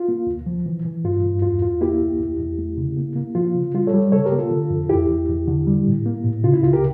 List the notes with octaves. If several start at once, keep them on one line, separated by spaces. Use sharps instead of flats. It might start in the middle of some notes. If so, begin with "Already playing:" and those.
Already playing: F4
A#3
D2
F3
E3
E3
G2 F4
G2
E2 F4
E2 F4
A#3 E4 G4
C#2
E2
E2
A3
C#3
A#3
A#3
F3 F4
C#3
G3 F4
A4 C#5
G3
C#3 A4 C#5
G4 A#4
A#3
F4 A4
D3
F2
E2 E4 G4
E2
E2
D3
G3
A2
A#3
A2
C#3 F4
E4
C#2 F4
G4 A#4